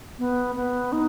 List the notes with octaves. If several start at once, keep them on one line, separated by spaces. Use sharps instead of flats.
B3
B3
D#4